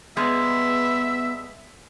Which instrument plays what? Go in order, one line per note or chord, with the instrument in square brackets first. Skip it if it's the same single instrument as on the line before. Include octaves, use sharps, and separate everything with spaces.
[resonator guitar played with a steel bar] G2 G#3 [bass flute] B3 [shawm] E5